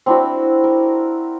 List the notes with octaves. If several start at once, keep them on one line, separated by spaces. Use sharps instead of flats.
C4 D4 E4 F#4
A#4